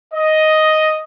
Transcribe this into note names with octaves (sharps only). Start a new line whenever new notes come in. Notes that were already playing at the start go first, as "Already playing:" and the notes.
D#5